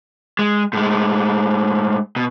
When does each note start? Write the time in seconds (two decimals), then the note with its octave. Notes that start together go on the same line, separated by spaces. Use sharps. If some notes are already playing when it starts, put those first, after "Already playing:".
0.39 G#3
0.73 A2 G#3
2.16 B2